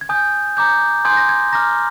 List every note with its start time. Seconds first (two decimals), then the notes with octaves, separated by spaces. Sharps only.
0.01 G#6
0.09 G#5 D#6 G6
0.57 A#5 D6 G6
1.05 G#5 C6 D#6 G6 G#6
1.17 A#6
1.29 G#6
1.53 A#5 D6 F6 A#6